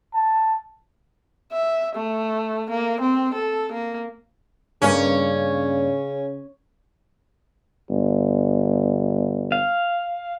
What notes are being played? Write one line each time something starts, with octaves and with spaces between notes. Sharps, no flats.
A5
E5
A3
A#3
C4
A4
A#3
G2 C#3 A#3 C#4 C#5
G1
F5